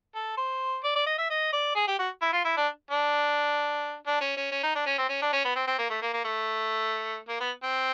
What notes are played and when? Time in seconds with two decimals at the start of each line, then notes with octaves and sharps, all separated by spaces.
0.15 A4
0.37 C5
0.84 D5
0.95 D5
1.06 D#5
1.18 E5
1.30 D#5
1.52 D5
1.76 G#4
1.87 G4
1.99 F#4
2.22 E4
2.33 F4
2.44 E4
2.57 D4
2.91 D4
4.07 D4
4.21 C#4
4.37 C#4
4.51 C#4
4.63 D#4
4.75 D4
4.86 C#4
4.98 C4
5.09 C#4
5.22 D4
5.33 C#4
5.45 B3
5.56 C4
5.67 C4
5.78 A#3
5.90 A3
6.02 A#3
6.13 A#3
6.24 A3
7.28 A#3
7.40 B3
7.64 C4